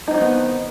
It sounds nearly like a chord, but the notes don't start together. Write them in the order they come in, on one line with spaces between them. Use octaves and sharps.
D#4 C4 F#3 D#3 B3